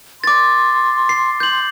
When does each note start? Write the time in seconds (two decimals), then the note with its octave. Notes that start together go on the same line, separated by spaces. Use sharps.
0.24 C6 D6 A6
1.09 C7
1.40 G6 F#7